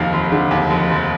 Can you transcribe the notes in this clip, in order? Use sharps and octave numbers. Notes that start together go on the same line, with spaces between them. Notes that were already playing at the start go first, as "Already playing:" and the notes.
Already playing: F1 D#2 F5
F1
D3
D#2
F1
F1